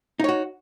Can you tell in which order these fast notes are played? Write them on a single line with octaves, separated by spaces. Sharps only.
D#4 C#5 F#4